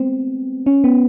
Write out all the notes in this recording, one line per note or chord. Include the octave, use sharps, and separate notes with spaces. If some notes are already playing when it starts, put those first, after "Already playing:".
Already playing: G#3 A3 B3 C4
C#4
B3